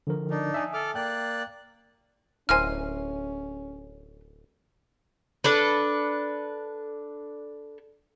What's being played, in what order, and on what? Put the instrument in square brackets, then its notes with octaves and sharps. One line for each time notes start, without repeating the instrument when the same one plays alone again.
[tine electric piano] D3 F3 A#4
[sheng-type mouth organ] D4 D#4
[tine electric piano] E5 G#5 D#6
[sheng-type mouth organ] A4 D6 F6
[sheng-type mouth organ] A#3 D5 F#6 [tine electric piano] G5
[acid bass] D1 [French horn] C#4 [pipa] E4 A#4 C5 [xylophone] G#5 F6
[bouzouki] D4 A4 B4